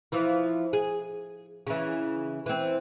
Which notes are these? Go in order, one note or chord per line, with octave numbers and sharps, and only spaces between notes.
E3 F3
G#4
C#3 E3
E3 C4